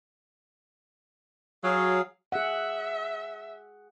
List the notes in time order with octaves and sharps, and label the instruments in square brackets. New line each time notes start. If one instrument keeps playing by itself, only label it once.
[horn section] F#3 [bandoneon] G#4 F5
[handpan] G#4 F#5 [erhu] E5